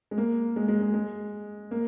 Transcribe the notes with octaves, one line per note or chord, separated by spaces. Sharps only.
G#3
A#3
G#3
G#3
G#3
G#3
A#3